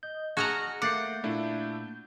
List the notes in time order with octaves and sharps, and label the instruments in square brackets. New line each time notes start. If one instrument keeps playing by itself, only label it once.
[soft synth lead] D#5 [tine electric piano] G6
[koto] F#4 D#5 A#5 [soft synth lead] G#4 [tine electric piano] A5 F6 F#6 [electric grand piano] G#6
[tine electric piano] A3 A#3 [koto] F#5 [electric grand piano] D6 A6 C7 [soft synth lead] G6
[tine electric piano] A#2 A#3 [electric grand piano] A3 D4 E4